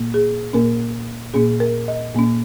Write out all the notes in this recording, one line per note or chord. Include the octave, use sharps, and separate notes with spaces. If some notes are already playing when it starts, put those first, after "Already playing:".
Already playing: A#2 A#3
G#4
A#2 A#3 C#4 A#4
A#2 A#3 C#4 G#4
A#4
D#5
A#2 A#3 C#4